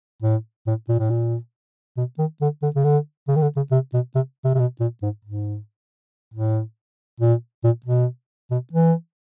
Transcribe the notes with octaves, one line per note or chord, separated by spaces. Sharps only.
A2
A2
A#2
A2
A#2
B2
D#3
D3
D3
C#3
D3
C#3
D#3
D3
C#3
C3
B2
C3
C3
C3
B2
A#2
G#2
G#2
A2
A#2
A#2
B2
B2
E3